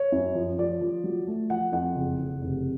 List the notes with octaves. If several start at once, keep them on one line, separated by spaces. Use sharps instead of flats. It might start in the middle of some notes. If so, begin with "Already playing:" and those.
Already playing: C#5
F#2
F3
F3 D5
F3
F#3
A3
F3 F#5
F2 F#5
F#1
F#1
F1